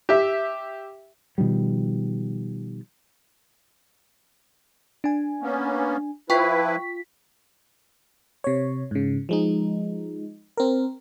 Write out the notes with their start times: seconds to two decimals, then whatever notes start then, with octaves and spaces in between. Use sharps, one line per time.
0.09 G4 E5
1.38 B2 D#3 F3 G3
5.04 D4 G#5
5.42 A#3 B3 C#4
6.30 F3 E4 F4 B4 G5 C#6 B6
8.44 C3 C#5
8.91 G#2 C#3
9.29 F3 G#3 D#4
10.57 C4 A#4